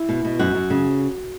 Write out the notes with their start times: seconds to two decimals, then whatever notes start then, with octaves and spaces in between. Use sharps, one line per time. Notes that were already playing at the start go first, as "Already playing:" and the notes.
Already playing: E4
0.09 B2
0.25 B2
0.39 F#2 F#4
0.55 F#2
0.70 C#3